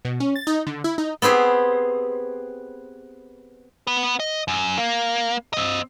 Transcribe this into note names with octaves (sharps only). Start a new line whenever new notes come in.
B2
C#4
A6
D#4
D3
E4
D#4
B3 C4 G4 G#4 C5
B3 B4
D#5
F#2
A#3
C4 D#5